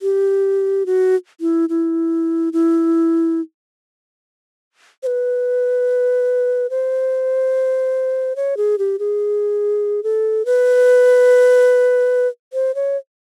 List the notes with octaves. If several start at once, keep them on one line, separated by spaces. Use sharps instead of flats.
G4
F#4
E4
E4
E4
C5
B4
C5
C#5
G#4
G4
G#4
A4
B4
C5
C#5